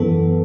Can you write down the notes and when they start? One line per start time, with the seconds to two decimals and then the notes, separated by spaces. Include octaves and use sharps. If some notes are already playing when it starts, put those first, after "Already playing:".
Already playing: F#2 E3 B3 A4